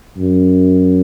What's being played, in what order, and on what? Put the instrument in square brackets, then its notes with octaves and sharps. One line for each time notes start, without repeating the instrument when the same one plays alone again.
[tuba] F#2